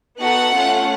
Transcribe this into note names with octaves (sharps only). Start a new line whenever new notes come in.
B3 D#4 F#4 A4 F#5
A3 C#4 F4 A4